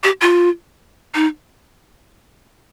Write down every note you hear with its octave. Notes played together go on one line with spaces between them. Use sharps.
G4
F4
D#4